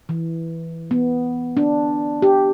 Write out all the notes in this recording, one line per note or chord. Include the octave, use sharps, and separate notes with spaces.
E3
B3
D4
G4